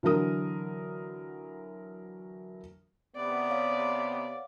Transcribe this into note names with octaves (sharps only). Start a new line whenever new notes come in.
D3 E3 F#3 A#4 D#6
C3 B3 D5
C#5 F5 F#5